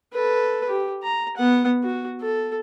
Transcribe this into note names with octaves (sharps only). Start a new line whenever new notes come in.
A4 B4
G4
A#5
B3 F#5
F#4
A4